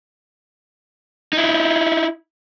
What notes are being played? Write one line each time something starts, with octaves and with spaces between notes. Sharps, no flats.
D#4 E4